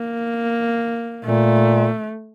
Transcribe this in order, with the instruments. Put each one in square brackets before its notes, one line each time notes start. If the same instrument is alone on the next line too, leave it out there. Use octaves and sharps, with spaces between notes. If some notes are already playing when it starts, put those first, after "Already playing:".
Already playing: [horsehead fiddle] A#3
[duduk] A#2 [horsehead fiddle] A3